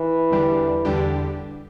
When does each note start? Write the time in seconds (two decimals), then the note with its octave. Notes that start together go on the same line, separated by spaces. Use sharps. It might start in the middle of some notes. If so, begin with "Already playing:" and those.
Already playing: E3
0.31 E2 D3 G3 D4 G4
0.85 E2 D3 G3 D4 G4